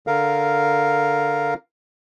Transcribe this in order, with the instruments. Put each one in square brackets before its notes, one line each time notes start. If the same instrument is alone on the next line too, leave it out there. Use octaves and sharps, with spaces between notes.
[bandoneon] D3 A#4 F5